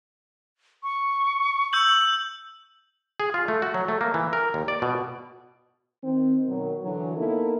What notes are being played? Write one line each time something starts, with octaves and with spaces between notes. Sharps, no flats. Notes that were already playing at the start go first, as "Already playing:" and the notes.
C#6
E6 G6 F#7
G#4
F4
A3
F#4
F#3
A3
A#3
E3
A#4
D#2
D5
B2
D#3 C4
B2 D#3 F#3
D3 E3 F#3
A#3 B3 D#4 E4 A4 A#4